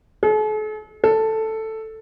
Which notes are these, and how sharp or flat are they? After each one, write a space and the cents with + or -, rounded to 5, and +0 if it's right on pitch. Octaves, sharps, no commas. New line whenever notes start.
A4 -45
A4 +5